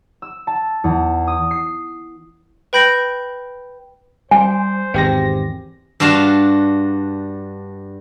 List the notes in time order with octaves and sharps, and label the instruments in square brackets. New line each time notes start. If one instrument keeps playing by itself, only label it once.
[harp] E6
A5
E2
D#6
C7
[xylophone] B4 G5 B5 G6 A#6 D7
[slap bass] G3 [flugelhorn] C5 [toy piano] G#5
[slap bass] G#1 E2 [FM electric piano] C4 G4 A#6
[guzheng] G2 D4 F#4 F5 A5